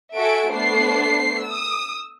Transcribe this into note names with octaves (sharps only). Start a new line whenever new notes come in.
F#4 A4 E5 G#5 D7
A3 B3 D4 C5 C7
D#6 E6